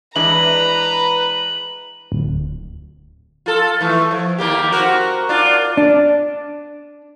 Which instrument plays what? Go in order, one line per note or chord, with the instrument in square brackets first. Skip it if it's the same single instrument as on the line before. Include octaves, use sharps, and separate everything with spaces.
[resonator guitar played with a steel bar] E3 G#3 D4 [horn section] B4 [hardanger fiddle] A#5 [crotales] F#7
[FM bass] D1
[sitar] F4 A4
E3 A3
F3
D#2 A#3 G4
C4 F#4 A#4
D4 F4
[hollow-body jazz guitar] D4